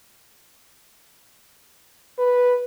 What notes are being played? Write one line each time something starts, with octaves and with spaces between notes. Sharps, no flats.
B4